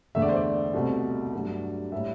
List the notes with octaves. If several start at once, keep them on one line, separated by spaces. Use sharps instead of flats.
E2 D3 A3 E5
D5
C5
D5
C2 B2 A3
G2 F#3 A3
A2 G3 E5